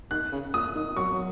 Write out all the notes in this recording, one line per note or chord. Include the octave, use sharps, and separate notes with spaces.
D#3 F#6
C#3
A#2 D#6
D#3
F#3 C#6
F#3